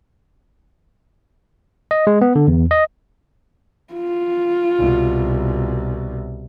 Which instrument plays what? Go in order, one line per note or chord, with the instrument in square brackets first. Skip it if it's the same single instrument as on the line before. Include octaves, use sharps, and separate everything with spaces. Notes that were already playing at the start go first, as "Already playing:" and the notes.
[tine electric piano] D#5
G#3
B3
D3
E2
D#5
[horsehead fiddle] F4
[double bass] C2 B2